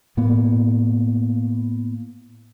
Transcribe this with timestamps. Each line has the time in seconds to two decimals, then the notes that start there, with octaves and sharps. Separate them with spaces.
0.17 A2 A#3 B3